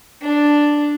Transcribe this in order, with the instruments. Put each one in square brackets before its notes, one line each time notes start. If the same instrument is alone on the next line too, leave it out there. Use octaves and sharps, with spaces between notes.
[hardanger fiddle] D4